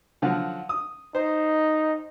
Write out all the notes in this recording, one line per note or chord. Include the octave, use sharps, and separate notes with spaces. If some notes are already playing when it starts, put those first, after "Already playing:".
D3 F3 F#3
D#6
D#4 C5